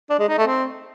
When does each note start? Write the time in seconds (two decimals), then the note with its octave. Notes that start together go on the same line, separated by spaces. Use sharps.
0.10 D4
0.19 G#3
0.29 D#4
0.38 A3
0.48 C4